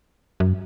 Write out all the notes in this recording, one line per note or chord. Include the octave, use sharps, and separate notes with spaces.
F#2